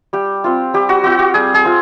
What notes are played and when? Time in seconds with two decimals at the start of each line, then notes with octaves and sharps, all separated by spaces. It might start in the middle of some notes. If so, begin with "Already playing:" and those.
0.13 G3 G4
0.44 C4 F4
0.74 G3 G4
0.89 F#4
1.04 C4 F4 F#4
1.19 G4
1.34 G3 G#4
1.54 G#4
1.65 C4 F4